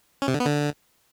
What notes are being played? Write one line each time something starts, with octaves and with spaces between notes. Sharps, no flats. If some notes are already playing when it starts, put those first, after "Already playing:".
C#4
C3
D3
B3
D3